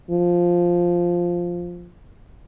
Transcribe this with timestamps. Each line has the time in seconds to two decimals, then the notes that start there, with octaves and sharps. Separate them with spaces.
0.10 F3